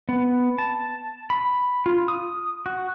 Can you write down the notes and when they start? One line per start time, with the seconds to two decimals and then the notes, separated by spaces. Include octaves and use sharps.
0.09 B3
0.58 A5
1.30 B5
1.86 F4
2.08 D#6
2.66 F#4